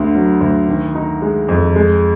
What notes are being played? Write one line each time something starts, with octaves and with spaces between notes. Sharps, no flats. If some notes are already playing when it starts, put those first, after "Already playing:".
Already playing: D2 D3
F#3
D2
D#3
D#4
G#3
F2
G#3